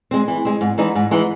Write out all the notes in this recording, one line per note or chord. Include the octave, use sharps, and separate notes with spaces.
G#3 C4
E3
G#3 C4
G#2
E3 G#3 D#4
G#2
E3 G#3 D#4